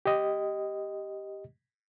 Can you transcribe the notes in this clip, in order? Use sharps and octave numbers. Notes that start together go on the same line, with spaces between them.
G4 D#5